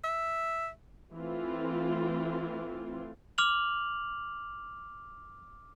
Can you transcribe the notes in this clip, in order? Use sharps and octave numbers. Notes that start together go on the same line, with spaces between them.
E5
E3 A3 C4 F4
D6 F6 F7 F#7